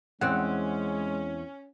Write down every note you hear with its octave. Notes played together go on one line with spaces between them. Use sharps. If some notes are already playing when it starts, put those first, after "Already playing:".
E2 G#3 C4 C#4 F#5